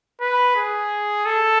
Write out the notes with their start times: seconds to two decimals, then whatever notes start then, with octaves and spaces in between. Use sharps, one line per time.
0.21 B4
0.56 G#4
1.26 A4